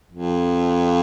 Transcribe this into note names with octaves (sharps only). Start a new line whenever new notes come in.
F2